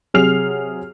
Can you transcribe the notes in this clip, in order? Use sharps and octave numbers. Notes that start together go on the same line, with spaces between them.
C3 F#3 G#4 F6 C7 F7